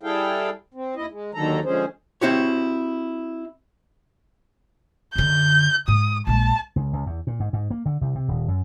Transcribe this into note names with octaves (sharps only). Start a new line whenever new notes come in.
G3 E4 G#4 A4 F5 G5
C4
D#2 E4 D#5
G#3
D#2 D3 D#3 F#3 A4 A#5
D3 F3 G#3 C#4 G#4 C5
C4 E4 F#4 G4 C#5
F#2 D3 G6
G#2 D#6
A#1 G#3 A5
C#2
C#2
E2
A#2
G#2
G#2
A#3
D3
C2
C3
D#1
F#2